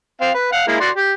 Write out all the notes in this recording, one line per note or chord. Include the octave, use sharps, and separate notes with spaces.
C4 F5
B4
F5 F#5
G#3 A#3 E4
F#4 D5 C6
G4